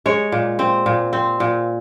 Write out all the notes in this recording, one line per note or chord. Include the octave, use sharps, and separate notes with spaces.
G#3 C#5
A#2
C4
A#2
C4
A#2